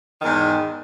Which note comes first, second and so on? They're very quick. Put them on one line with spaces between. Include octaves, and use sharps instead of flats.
D#3 E2 G#2